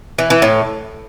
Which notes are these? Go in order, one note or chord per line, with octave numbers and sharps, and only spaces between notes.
E3
E3
A2